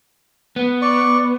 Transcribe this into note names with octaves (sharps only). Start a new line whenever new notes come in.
B3
D5 C#6